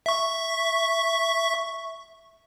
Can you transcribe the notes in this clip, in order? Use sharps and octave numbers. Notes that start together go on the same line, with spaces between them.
E5 C#6